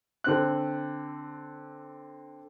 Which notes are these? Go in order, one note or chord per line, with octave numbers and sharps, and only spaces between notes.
D3 C4 F#6